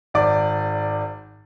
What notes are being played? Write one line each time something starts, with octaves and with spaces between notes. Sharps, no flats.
G#1 D5 D6